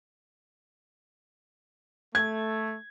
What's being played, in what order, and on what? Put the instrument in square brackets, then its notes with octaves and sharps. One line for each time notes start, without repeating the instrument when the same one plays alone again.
[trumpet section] A3 [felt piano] G#6